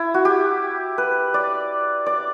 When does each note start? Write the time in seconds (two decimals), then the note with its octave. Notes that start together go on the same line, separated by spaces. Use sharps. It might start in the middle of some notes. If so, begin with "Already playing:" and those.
Already playing: E4
0.14 F#4
0.25 G4
0.98 B4
1.34 D5
2.06 D5